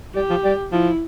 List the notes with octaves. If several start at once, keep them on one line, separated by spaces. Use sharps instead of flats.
G3 G4
F3
G3
F3 E4